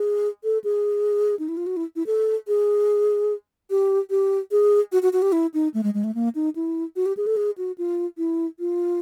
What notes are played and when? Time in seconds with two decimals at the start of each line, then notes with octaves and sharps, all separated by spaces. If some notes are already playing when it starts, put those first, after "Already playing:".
Already playing: G#4
0.44 A4
0.64 G#4
1.39 D#4
1.48 E4
1.57 F4
1.67 F#4
1.77 E4
1.96 E4
2.07 A4
2.48 G#4
3.70 G4
4.10 G4
4.51 G#4
4.92 F#4
5.02 F#4
5.13 F#4
5.22 G4
5.32 E4
5.54 D#4
5.74 A3
5.83 G#3
5.94 G#3
6.04 A3
6.15 A#3
6.35 D#4
6.56 E4
6.96 F#4
7.06 G4
7.17 G#4
7.27 A4
7.37 G#4
7.58 F#4
7.78 F4
8.18 E4
8.60 F4